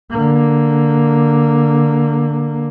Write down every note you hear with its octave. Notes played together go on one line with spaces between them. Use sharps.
D3 A#3